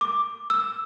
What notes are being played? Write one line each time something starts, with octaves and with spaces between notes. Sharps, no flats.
D6
E6